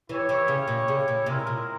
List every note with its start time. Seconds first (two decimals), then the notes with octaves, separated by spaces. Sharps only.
0.09 E3 E4 G4 C#5
0.29 E3
0.48 C#3
0.68 A#2
0.88 C#3
1.08 A#2
1.26 C3 G#3 C4 E4 A#4
1.47 A#2